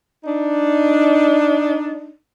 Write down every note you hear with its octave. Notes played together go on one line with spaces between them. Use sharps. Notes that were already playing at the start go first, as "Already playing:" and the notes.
D4 D#4